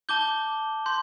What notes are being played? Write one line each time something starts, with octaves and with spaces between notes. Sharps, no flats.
A5 D6 G6 G7
C6 G6